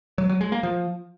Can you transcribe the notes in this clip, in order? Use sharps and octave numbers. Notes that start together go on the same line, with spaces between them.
F#3
F#3
G#3
A#3
F3